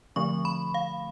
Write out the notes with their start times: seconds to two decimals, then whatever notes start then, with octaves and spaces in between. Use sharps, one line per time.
0.16 D3 F3 A3 C4 C#6
0.45 B5
0.74 F5